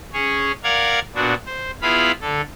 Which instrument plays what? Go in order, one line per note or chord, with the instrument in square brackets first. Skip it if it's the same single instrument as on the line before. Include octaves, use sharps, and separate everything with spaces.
[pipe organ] C#4 G#4 C#5
A#4 D5 F5 F#5 G#6
A#2 B3 D4 F#4
C5
B3 E4 F4 G#4 F5 B5
D3 A4